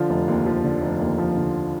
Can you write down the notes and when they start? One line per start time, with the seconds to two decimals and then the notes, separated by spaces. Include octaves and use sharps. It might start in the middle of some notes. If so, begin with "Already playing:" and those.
Already playing: D3 F3 F4
0.10 F1
0.28 D#2
0.46 F3
0.64 D3
0.82 F1
1.00 D#2
1.18 F3
1.37 D3